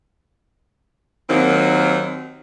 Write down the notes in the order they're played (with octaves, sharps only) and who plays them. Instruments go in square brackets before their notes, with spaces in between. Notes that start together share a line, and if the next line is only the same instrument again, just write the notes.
[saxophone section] D#2 D#3 F#3 A#3 C4